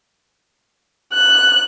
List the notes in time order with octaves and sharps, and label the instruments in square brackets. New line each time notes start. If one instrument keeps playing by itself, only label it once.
[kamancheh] F#6